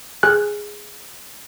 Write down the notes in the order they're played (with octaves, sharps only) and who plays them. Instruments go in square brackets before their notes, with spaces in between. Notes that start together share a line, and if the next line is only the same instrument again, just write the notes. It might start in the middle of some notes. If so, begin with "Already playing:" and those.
[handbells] G#4 G#5 F6 F#6